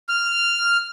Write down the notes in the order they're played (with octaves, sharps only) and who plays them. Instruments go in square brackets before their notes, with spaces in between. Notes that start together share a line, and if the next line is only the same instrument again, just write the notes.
[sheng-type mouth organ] F6